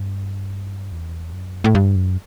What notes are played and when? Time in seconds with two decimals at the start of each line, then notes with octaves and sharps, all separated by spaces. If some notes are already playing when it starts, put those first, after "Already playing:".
Already playing: G2
0.92 E2
1.33 F#2
1.64 A2
1.75 G2
1.96 F#2